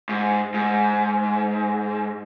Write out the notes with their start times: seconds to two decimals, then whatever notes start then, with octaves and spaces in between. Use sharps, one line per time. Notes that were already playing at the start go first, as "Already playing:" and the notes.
0.09 G#2
0.54 G#2